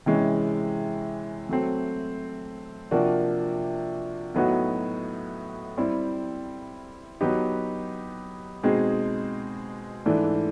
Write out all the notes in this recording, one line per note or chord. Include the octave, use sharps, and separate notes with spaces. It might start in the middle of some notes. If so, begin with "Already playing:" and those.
C3 E3 G#3 C#4
F#3 A3 C4
C3 F3 A#3 D4 F#4
A2 F#3 B3 D#4 F#4
G3 C4 E4
F#3 B3 D#4 G4
B2 G#3 C4 D#4 G#4
G#2 E3 A3 D4